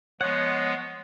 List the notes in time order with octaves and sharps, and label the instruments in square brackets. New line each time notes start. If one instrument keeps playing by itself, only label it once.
[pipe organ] F3 G#3 B3 [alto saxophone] C#5 [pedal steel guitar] F#5